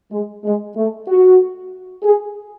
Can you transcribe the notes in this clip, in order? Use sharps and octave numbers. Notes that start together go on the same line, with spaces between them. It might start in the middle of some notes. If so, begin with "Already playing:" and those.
G#3
G#3
A3
F#4
G#4